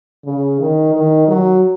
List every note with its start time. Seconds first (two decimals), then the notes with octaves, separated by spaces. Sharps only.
0.25 C#3
0.60 D#3
0.94 D#3
1.28 F#3